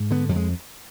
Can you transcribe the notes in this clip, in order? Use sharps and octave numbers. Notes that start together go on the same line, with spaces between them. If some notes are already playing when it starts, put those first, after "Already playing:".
Already playing: G#2
D3 B3
F2 G3
G#3